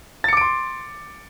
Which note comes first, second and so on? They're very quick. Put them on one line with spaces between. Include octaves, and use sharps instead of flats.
A6 C#7 D6 D7 C6